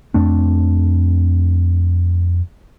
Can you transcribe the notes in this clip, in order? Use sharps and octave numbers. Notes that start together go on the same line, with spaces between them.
F2 A3 C4 D4